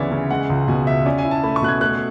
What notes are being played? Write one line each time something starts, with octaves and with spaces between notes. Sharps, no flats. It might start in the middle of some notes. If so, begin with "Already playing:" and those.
Already playing: D2 C#3 E3 B3 C#5 D5 E5
C#3
G#3 F#5
C#2
B2 G#5
C#2 E5
C#4 D5
G#5
E4
A5
A3 B5
C#6
B2 F#6
G#6
A3 F#6